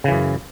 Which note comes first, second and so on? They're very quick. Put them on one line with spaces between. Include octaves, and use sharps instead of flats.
C#3 E3 F#2